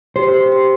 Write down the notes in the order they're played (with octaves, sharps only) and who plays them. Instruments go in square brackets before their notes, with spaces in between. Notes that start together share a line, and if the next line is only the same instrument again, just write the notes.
[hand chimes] G4 [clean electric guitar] C5
[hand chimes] G4
G4